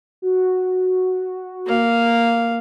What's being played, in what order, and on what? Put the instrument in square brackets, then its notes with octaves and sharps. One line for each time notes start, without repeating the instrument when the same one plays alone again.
[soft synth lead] F#4
[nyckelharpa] A#3 F5